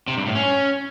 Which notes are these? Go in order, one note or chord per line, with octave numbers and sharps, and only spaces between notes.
C3
G2
A2
C#4